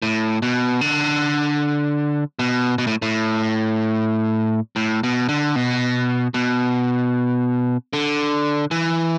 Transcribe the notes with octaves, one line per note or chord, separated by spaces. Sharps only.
A2
B2
D3
B2
B2
A2
A2
A2
B2
D3
B2
B2
D3
E3